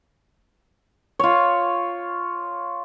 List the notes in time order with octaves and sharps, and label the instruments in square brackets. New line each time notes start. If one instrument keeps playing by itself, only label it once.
[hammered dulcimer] F4 C#5